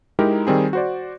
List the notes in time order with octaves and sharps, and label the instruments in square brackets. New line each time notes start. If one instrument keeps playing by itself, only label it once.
[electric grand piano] G#3 D#4 E4 G4 A#4
D#3 G3 C4 G#4
F#4 C5 D5